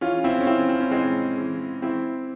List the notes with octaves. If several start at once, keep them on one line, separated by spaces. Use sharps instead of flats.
E3 C#4 F4
C4 E4
C#4
E3 C4 E4
C4
C#4
E3 G#3 C4
E3
E3 C4 E4